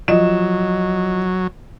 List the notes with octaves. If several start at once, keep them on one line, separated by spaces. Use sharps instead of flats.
F3 F#3 D#5 E7